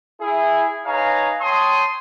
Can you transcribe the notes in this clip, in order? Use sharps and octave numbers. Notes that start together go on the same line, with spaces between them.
E4 G#4
D#4 B4 C#5 F5 G#5 A#5
C#5 G5 A5 C6 D#6